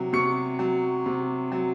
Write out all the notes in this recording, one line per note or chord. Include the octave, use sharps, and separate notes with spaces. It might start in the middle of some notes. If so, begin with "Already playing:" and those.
Already playing: C3 F#3
C3 C#6 C#7
F#3
C3
F#3